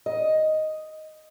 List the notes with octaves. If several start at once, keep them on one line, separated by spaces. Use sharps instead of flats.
D#5